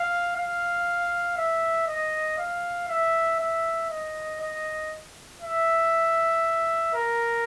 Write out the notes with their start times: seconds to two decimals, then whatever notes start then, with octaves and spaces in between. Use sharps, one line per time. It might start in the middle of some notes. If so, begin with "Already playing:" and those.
Already playing: F5
0.36 F5
1.37 E5
1.88 D#5
2.38 F5
2.89 E5
3.39 E5
3.90 D#5
4.40 D#5
5.42 E5
6.94 A#4